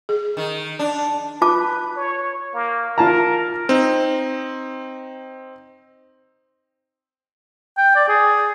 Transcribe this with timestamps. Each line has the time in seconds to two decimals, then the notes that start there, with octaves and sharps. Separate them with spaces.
0.09 G#4
0.37 D#3
0.79 D4
1.42 F4 B4 A5 D6
1.97 C#5
2.54 A#3
2.98 F4 A#4 A5 A#5
3.69 C4 D#4
7.78 G5
7.96 D5
8.09 G#4